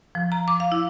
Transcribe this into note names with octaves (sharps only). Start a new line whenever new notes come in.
F3
A#5
D6
F5
E4